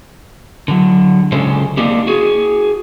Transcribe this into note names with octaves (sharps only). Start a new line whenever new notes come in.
D3 F#3
C#3 G#3 C#4 A4 C5
A#3 C4 D4 D#4 G4
F#4 G#4